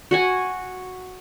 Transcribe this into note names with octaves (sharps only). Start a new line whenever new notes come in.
F#4 F#5 G#5